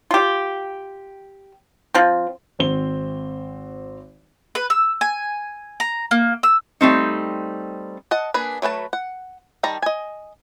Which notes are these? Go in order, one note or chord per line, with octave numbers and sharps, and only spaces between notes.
F4 G4
F3 C4
G#1 C4 G7
B4
E6
G#5
A#5
A#3
E6
G3 A3 C4 D#4
D#5 F#5 A5
A#3 D4 G#4 B4
F#3 A3 B4 A5
F#5
D#3 G3 A5 A#5
D#5 G#5